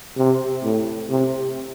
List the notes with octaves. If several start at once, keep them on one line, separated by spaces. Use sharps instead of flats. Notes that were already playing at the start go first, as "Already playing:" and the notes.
C3
A2
C3